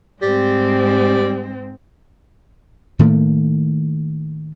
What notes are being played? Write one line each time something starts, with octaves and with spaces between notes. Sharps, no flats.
G#2 G3 C4
A2 D#3 A3 A#3